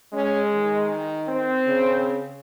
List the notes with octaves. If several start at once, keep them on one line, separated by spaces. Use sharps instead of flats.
G#3 C#4
D#3
C4
C#3